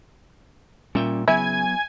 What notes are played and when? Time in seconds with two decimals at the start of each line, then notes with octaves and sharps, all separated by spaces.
0.95 A#2 G3 C#4 E5 G5
1.28 C#3 F#3 B3 E4 G#5 G#6